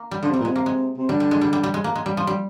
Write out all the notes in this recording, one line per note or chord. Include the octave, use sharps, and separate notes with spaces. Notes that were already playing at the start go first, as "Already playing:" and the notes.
Already playing: A#3
G3
D3 F3
C3 G3
A#2
C3 G#3
A#3
G#3
C3
D3 G3
G3
G#3
G3
G3
G3
G#3
A#3
G#3
G3
F3
G3